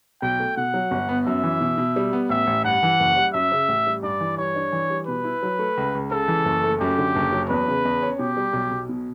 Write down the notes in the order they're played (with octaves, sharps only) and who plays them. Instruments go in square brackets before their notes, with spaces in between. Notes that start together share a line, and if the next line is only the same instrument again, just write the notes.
[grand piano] B1 [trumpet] G5
[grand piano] A3
[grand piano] B2 [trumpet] F#5
[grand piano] F#3
G1
B3
[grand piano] F#2 [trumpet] E5
[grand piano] E3
B2
B2
G3
B3
[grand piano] A1 [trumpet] E5
[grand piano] A1
[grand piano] G2 [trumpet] F#5
[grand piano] E3
F#1
G3
[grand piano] F#2 [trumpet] E5
[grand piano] C#3
A1
G3
[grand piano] G2 [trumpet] D5
[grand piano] E3
[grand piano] G2 [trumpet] C#5
[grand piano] D4
E3
G3
[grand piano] B2 [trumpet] B4
[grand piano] E4
F#3
A3
C#2
C#2
[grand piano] C#3 [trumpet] A4
[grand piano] E3
F#1
A3
[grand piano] F#2 [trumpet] G4
[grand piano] D3
F#1
F#3
[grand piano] E2 [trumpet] B4
[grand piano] C#3
E2
C#4
[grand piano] B2 [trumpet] G4
[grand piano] G3
B1
B1
B2